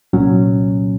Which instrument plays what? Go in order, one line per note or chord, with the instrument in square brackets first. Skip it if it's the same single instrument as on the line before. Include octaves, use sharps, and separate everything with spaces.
[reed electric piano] C2 A#2 F#3 C#4